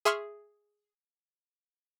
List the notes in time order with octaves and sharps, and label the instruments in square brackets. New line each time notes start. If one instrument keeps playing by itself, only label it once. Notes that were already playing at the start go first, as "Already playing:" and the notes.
[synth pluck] G#4 E5 C6 C#6 F6